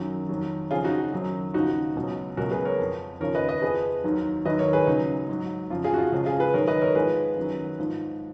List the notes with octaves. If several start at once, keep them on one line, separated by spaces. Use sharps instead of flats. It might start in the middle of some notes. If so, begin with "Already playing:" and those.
Already playing: F#2 D#3 F#3
F2 D#3 F#3
F2 C#3 F3 F4 G#4
D#4 F#4
F#2 D#3 F#3
D#2 C#3 F3 D#4 F#4
C#2 B2 F#3
C#2 B2 F#3 F#4 A#4
G#4 B4
A#4 C#5
F2 F3
D#2 C#3 F3 A#4 C#5
B4 D#5
B4 D#5
F2 F3 G#4 B4
D#2 D#3 F#3
D#2 D#3 F#3 B4 D#5
A#4 C#5
G#4 B4
C#2 C#3 F#3 D#4
G#2 F#3
F2 C#3 F3 F4
F4 G#4
F#4
F4
C#2 C#3 F3
F4 G#4
G#4 B4
G#2 D#3 F#3 A#4 C#5
B4 D#5
A#4 C#5
G#2 F3 G#4 B4
F#2 D#3 F#3
G#2 F3